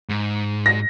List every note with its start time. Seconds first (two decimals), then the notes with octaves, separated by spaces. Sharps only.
0.09 G#2
0.66 A#6